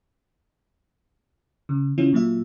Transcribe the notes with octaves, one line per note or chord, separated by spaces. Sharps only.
C#3
C#3 E3 C#4 E4 F4
A#2 F#3 F4 E5